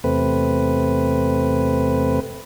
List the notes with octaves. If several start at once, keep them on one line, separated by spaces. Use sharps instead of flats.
E2 C3 A3 C4 B4